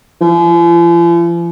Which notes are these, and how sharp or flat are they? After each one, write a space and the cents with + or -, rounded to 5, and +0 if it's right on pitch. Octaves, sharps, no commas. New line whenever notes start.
F3 -45